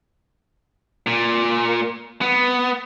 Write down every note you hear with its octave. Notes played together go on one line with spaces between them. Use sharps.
A#2
B3